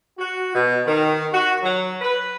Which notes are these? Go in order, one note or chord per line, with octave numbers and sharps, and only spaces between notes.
F#4
B2
D#3
F#4
F#3
B4